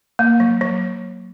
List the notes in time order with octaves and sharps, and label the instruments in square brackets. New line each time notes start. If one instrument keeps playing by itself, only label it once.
[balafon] A#3
F#3
F#3